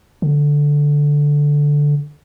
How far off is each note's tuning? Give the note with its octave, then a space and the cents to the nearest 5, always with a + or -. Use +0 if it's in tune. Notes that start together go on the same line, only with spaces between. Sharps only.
D3 -5